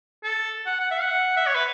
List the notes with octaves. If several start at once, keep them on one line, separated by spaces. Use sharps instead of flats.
A4
F#5
F#5
E5
F#5
E5
C#5
B4